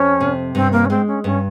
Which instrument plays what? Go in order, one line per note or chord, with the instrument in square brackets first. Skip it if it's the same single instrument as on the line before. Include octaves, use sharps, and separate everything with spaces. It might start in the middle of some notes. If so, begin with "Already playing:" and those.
Already playing: [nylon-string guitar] F2 [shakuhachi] C#4
[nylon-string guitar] C3
[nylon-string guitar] G2 [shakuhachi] C4
[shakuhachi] A#3
C#4
[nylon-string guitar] G#3 [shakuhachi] C4
[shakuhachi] C#4
[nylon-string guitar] G2 [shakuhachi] C#4